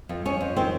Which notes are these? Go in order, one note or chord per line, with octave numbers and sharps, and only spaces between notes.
F2
F2 C#4
F2
D#3 C4